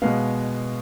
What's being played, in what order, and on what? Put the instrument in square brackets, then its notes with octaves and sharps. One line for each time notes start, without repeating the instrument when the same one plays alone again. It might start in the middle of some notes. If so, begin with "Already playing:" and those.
[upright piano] B2 G#3 B3 F5